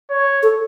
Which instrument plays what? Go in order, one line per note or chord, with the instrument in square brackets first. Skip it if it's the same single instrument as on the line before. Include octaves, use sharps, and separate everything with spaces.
[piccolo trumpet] C#5
[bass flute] A4